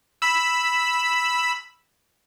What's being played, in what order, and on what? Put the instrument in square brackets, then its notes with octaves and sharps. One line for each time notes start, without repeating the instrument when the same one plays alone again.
[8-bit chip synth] B5 E6